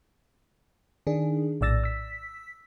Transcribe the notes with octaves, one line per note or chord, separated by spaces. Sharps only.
D#3 D4 G#4
A#1 A2 D5 E6 A6 A#6
E6 B6